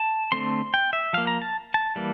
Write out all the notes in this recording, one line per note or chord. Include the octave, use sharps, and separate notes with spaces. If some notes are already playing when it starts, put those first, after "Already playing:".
Already playing: A5
D3 A3 C4 C6
G5
E5
F3 A#3 F5
A#5
A5
A5
E3 G3 A#3